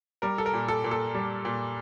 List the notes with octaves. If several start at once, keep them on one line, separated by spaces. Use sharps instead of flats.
G3 A#4
A4
A#4
A#2
A4
A#2
A4
G3
A#2